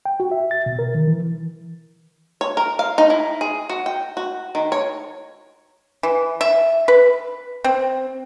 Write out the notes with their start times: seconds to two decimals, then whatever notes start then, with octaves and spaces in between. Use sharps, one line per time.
0.05 G5
0.20 F#4
0.31 E5
0.51 A6
0.66 B2
0.79 A#4
0.95 D#3
1.08 E3
2.41 C#5
2.57 A#4
2.79 F5
2.98 D#4
3.10 E4
3.41 G#4
3.70 F#4
3.86 G5
4.17 F#4
4.55 D#3
4.72 C#5
6.03 E3
6.41 E5
6.88 B4
7.64 C4